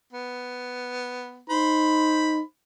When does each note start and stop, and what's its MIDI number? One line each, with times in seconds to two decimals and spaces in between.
0.13 1.43 59
1.50 2.41 63
1.50 2.42 72
1.50 2.42 83